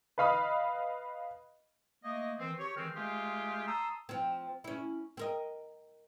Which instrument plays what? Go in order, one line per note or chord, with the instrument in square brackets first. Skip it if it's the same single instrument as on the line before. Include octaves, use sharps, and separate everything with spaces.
[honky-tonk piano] B4 D#5 F5 B5 D#6
[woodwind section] A3 A#3 D#5
D#3 E3 C4
G4 C#5
D#3 E3 G#3 C4 F6
G#3 A3 F4 G4 G#4
A5 A#5 C6 D#6 E6
[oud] F3 C4
C#4 E4
C4 A#4 D#5